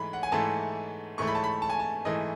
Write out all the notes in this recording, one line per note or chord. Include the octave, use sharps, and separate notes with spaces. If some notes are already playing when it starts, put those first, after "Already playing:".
Already playing: G#2 E3 A3 B5
F#5
G#5
G#2 E3 A3 A5
G#2 E3 A3 C#6
B5
A5
B5
A5
G#5
A5
G#2 E3 A3 D#5